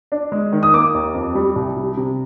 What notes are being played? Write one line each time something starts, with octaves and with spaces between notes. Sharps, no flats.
D4
G#3
D#3
D#6
A#3 D6
D#2
F2
G3
C2
G3
C3